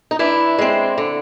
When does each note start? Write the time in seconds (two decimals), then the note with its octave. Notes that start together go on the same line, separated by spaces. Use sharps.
0.11 D#4
0.19 E3 D4 E4
0.59 G#3 C4
0.98 D3